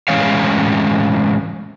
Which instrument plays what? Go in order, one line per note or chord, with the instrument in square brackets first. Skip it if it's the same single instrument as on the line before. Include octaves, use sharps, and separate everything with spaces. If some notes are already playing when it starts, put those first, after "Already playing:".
[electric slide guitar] A2 E3 G#3 C#4 C#5 F5